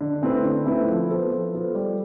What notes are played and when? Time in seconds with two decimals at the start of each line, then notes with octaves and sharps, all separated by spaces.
0.01 D3
0.22 A3 C4 E4 B4
0.43 D3
0.66 A3 C4 E4 B4
0.87 F3
1.09 B3 F4 A4 C5
1.31 F3
1.53 B3 F4 A4 C5
1.75 G3